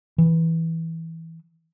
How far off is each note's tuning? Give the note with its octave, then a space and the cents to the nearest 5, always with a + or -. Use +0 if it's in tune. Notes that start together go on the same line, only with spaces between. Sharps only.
E3 -10